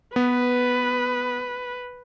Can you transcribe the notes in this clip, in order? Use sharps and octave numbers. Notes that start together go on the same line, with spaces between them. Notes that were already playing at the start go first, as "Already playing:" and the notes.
B3 B4